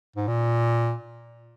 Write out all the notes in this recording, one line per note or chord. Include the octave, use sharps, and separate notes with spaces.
G#2
A#2